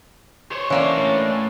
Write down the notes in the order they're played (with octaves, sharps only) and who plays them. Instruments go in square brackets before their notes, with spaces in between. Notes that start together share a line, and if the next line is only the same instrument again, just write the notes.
[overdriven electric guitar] C5 C#5
[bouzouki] E3 A#3 D4 [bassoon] C#4
[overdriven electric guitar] A2